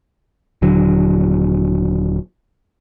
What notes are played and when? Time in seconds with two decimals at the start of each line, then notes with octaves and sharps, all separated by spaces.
0.62 D#1 D3 F#3